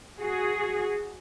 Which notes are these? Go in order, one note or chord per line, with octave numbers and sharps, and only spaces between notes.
F#4 G#4